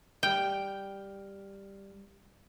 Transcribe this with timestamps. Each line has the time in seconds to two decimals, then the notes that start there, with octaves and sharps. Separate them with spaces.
0.23 G3 G5 F6